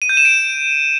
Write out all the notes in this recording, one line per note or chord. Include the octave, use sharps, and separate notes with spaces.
D#7
G6
E7
D7